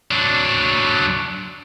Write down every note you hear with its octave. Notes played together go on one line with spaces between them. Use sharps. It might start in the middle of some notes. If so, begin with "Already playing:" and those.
F#3 D4